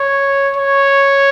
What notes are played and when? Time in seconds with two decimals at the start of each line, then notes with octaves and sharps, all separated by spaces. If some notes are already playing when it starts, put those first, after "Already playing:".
Already playing: C#5
0.56 C#5